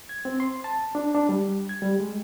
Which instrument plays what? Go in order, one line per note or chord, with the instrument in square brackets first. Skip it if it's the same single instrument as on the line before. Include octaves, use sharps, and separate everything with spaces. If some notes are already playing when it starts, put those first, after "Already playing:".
[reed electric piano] G#6
C4
C6
A5
D4
D4
G3
G#6
G3
G#3